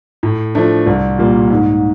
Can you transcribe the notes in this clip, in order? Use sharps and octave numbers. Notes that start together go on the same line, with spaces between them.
A2
F3 A3 D4
C2
A#2 G3 A#3
G#2